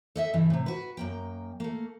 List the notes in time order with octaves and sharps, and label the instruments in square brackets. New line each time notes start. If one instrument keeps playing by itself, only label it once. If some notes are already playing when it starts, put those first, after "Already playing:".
[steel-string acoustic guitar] A4 D#5 E5
G2 C#3 E3
A2 C3
F#4 B4
F#2 A#3 G5
A3 A#3